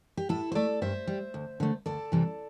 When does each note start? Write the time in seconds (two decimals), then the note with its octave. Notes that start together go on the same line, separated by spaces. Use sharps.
0.17 G4
0.29 A2 E4 A4
0.52 C5
0.55 A3 A4 D5
0.82 G2 C5 E5
1.07 G3
1.34 D2
1.60 D3 A3
1.86 D2 A4 D5
2.12 C3 E3 G3